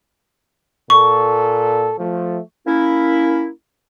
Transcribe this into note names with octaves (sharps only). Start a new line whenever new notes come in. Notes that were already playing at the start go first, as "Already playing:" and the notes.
A#2 A4 C#6
F3 A3
A#3 C#4 E4